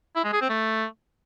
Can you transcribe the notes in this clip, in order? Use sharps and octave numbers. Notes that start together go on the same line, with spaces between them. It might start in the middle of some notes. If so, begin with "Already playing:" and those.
E4
G#3
G#4
C4
A3